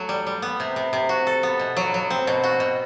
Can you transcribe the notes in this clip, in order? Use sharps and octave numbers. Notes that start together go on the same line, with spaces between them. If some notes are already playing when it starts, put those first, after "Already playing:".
Already playing: F#3 A3
G3
G3
B3
C3
C3
C3
F#4
A4
B3
B2
F#3
F#3
C4
B2
F#4
B2